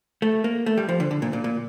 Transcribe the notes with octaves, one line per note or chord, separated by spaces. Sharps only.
A3
A#3
A3
G3
F3
D3
D3
A#2
A#2
A#2